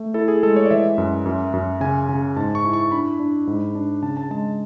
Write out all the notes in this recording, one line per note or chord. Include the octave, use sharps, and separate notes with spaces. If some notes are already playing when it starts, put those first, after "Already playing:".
Already playing: A3
E4 A4
G#4
G#3 A4
C#5
D5
E3 E5
F#2
F#2
F#2
C#3 G#5
C#3
G#2 A5
C#6
E4
C#6
D4 B5
D4
G#2
D4
C#3 A5
A5
G#3 A5